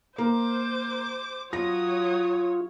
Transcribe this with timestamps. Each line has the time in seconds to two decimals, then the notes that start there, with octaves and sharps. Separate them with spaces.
0.18 A#3 C5 D6
1.53 F#3 F4 C#5 D#6 A#6